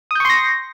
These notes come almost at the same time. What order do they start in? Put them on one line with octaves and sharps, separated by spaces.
D#6 G6 C#6 C6 A#6